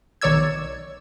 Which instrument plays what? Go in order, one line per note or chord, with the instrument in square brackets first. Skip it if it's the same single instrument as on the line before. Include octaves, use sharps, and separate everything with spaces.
[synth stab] B1 D#3 C#5 D5 E6 G#6